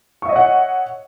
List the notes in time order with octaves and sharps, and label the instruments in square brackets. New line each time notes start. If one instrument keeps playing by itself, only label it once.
[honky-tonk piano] C#6
E5
D#5
C#5
F#5